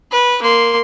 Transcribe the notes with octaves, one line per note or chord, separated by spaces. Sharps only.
B4
A#3 C6